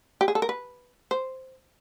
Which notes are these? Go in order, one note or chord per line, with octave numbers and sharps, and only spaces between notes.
G4
G#4
A4
A#4
B4
C5